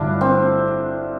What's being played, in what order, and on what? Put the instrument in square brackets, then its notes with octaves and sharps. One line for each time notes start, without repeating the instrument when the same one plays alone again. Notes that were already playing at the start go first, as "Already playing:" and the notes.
Already playing: [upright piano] G1 G2 D3 F#3 [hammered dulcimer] D4 E4
[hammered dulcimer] C4